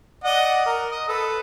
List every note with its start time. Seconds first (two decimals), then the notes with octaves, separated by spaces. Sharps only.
0.24 D5 D#5 F#5
0.66 A#4
0.91 D#5
1.08 A4 B4